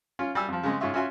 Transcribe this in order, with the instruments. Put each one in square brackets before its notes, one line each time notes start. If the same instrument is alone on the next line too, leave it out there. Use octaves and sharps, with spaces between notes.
[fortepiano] C#4 F4
G3 G#5 E6
F2 F3
C#3 G#3 C4
G#2 C#4 F4 E5 C#6
C#4 F4 F#4 E5 G#5 C6